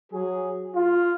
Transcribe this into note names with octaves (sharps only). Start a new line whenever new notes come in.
F#3 G#4
F4